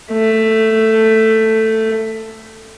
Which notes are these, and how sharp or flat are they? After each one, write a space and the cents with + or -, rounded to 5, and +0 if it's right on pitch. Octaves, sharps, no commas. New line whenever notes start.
A3 +10